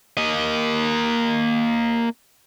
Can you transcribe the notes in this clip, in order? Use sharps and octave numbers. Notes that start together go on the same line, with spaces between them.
A#3 D#5